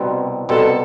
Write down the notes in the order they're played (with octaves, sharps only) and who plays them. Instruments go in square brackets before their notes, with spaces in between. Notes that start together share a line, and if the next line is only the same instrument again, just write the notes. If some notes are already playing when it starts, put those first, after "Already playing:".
Already playing: [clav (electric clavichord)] C2 B2 G3 C4
[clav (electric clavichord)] C2 B2 G3 C4 [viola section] A4